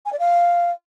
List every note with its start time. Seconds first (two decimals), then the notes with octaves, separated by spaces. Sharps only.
0.05 G#5
0.12 D5
0.19 F5